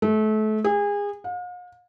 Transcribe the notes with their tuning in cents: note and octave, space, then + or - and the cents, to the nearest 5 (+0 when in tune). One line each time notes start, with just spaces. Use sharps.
A3 -30
G#4 -30
F5 +45